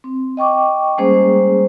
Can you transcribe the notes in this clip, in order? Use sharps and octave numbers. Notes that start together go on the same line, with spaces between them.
C4
D#5 G5 C#6 D6
G3 G#3 A#3 C#4 G#4 C5